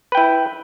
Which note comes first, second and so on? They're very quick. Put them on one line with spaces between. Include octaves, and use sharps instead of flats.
B4 G5 E4